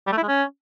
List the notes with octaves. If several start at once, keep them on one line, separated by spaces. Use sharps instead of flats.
G3
A3
E4
G#3
C#4